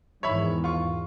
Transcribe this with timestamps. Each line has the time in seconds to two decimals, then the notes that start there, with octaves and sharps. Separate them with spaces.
0.23 E2 G#2 D#3 C#5 E5 B5
0.64 F4 C#6